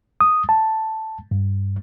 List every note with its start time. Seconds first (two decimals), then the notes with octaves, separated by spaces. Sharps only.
0.21 D#6
0.49 A5
1.31 G2